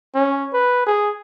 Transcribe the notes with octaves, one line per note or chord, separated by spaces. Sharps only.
C#4
B4
G#4